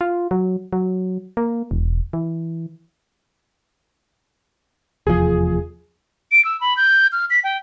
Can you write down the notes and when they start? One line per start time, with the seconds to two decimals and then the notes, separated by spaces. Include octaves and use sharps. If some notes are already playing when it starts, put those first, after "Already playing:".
0.01 F4
0.31 F#3
0.73 F#3
1.37 A#3
1.71 E1
2.13 E3
5.07 F1 E2 F3 G#4
6.32 D7
6.45 E6
6.61 B5
6.77 G6
7.12 F6
7.30 B6
7.44 G5